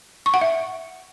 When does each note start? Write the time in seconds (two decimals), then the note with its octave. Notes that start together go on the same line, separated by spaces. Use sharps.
0.26 C#6
0.34 F#5
0.41 E5